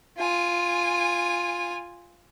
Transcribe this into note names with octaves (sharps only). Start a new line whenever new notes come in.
F4 G#5